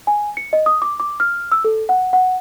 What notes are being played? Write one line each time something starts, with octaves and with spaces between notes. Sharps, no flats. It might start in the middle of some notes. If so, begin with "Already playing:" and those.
G#5
C#7
D#5
D#6
D6
D6
F6
E6
A4
F#5
F#5